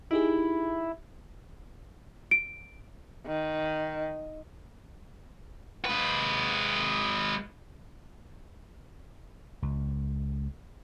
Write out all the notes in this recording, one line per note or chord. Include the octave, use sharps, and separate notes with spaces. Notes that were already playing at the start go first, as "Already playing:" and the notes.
D#4 E4 G4 G#4
D7
D#3
G#3 B4
C#2